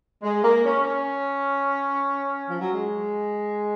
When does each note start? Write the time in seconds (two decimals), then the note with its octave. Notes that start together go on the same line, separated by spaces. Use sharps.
0.23 G#3
0.44 A#3
0.65 C#4
0.86 C#4
2.50 F3
2.61 F#3
2.72 G#3